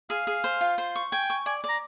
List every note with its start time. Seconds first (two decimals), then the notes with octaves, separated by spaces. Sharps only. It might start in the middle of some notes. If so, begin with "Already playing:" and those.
0.10 G#4 F5
0.27 G#4
0.44 C5
0.61 F4
0.78 C5
0.96 C#6
1.12 G5 G#5
1.30 C#6
1.46 D5 G#5
1.64 D5
1.69 A#5